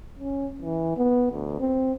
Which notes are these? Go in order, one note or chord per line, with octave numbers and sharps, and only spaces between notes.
C#4
E3
B3
D2
C4